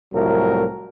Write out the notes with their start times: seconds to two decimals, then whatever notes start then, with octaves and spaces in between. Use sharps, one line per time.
0.14 C2 A2 F3 F#3 A#4